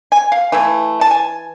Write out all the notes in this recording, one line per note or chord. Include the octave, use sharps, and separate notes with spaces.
G#5
F5
E3 A3 E4
A5
G#5